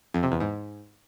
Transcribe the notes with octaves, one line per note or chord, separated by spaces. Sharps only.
F2
C3
E2
G#2